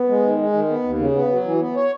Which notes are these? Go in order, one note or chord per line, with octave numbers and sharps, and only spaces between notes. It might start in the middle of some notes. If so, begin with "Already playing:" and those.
Already playing: B3
G#3
D#3
G#3
D#3
B3
D#2
C#3
B3
F#3
E3
B3
C#5